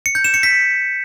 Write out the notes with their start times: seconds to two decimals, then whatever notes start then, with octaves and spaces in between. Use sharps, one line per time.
0.06 C#7
0.15 G6
0.24 E7
0.34 C#7
0.43 B6